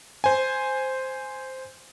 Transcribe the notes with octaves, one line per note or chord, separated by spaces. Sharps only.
C5 G#5